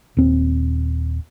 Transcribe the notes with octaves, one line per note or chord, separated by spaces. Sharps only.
D#1 C4